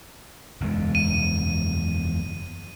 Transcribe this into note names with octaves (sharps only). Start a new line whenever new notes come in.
F#1 E2 G#3
D#7